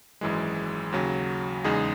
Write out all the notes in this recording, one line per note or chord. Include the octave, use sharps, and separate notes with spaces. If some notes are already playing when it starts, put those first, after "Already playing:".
G#1 F#2 E3 G#3
D#2 C#3 F#3
E2 C#3 G#3 D#4 G#4